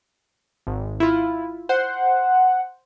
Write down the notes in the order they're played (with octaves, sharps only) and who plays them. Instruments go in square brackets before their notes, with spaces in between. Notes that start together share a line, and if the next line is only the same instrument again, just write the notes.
[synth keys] G#1
E4 F4
[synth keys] C5 [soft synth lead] F#5